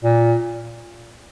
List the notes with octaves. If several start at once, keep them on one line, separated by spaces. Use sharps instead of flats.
A#2